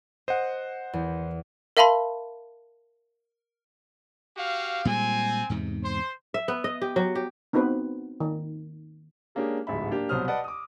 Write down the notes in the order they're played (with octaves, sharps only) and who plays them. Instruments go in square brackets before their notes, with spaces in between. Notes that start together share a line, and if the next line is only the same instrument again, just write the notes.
[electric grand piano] C5 F#5 [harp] D#5
[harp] E2
[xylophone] A#4 E5 F5 A5 B5 C6
[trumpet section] F#4 G4 F5
[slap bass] A#2 G3 G#3 [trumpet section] C4 G#5
[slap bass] E2 G#2 C3
[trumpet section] C5 C6
[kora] E5
B3
D#5
G4
F#3
G4
[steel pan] B3 C4 D#4 F#4 B4 C5
D#3
[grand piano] G#3 A#3 C#4 D4 G4 G#4
D1 A1 G#2 E5 B5
A#3 D4 G4
C2 B2 F#3 C5 D#6 F6
B4 D5 D#5 F#5 A5
D6 D#6